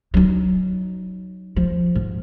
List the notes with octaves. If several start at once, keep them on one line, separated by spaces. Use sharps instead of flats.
F#3 D#4
F3
G#2